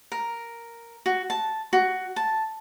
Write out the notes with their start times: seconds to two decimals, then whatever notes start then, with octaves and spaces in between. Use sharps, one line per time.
0.12 A#4
1.06 F#4
1.30 A5
1.73 F#4
2.16 A5